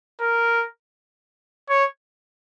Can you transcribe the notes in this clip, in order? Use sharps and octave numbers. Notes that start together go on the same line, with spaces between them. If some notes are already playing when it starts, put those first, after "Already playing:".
A#4
C#5